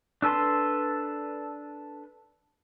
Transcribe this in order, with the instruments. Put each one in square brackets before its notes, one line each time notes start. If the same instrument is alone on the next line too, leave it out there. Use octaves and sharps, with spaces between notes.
[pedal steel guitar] D4 A4 B4 A5 C6